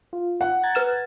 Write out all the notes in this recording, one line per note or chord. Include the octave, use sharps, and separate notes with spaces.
F4
F#5
A#5 G#6 A6
B4 F6 E7